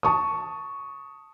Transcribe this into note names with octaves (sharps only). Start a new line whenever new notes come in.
A5 C#6 D#6